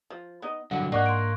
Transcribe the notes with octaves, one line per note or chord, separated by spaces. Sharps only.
F3
B3 D#4 D#5
G2 D3 F#3 F#5
G#2 A#3 D4 D#5 F#5 C#6 F#6
C6 D7